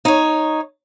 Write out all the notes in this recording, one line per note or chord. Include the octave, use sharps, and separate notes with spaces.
D#4 C#5